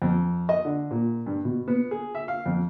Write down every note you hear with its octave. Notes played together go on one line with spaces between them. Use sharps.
F2
D#5
D3
A#2
G2
B2
B3
G#4
E5
F5
F2